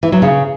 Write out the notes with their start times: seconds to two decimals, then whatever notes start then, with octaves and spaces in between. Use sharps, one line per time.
0.03 E3
0.12 F#3
0.22 C#3